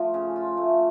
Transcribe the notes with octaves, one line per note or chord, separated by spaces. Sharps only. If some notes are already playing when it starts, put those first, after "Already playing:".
Already playing: F3 A3 F4
C#3
F4
A3